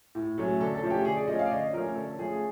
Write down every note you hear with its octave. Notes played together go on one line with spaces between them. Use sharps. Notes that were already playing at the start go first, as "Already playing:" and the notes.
A2
F#3 A3 C#4
D3 A4
A4
F3 A3 C#4
G4
D3 G#4
D5
F3 A3 C#4 D#5
F5
D5
D3 D#5
F3 A3 C#4 A#4
D3 A4
F3 A3 C#4 G#4